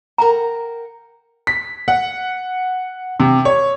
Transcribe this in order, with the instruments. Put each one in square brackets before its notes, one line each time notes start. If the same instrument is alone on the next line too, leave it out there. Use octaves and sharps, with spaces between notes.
[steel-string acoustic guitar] A#4 F#5 G5 [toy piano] A#5
[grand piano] B6
F#5
C3
C#5